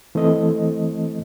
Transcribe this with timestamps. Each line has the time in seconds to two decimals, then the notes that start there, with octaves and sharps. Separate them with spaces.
0.15 E3 A3 C4 A4 D#5